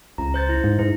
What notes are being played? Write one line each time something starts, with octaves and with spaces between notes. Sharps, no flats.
C#2 A#5
C5 G6 A6
E4
G#2
G#2 E4